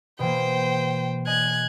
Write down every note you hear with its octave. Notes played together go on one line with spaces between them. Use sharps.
B2 E3 A#3 C5 G5
D#5 G#5 F#6 G#6